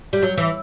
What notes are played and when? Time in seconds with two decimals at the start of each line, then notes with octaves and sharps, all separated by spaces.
0.13 G3
0.23 F#3
0.38 E3